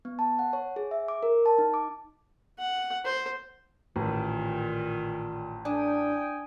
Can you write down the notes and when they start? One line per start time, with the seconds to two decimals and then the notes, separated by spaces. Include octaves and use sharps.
0.05 B3
0.19 A5
0.39 F#5
0.53 C#5
0.76 G#4
0.91 E5
1.08 D6
1.23 A#4
1.46 A5
1.58 D#4
1.74 D6
2.59 F#5
3.05 C5
3.96 A1 A#2 D#3
5.65 D4 G5 G#5 D#6